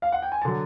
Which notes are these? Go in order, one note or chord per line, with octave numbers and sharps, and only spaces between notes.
F5
F#5
G5
G#5
D3 F#3 A5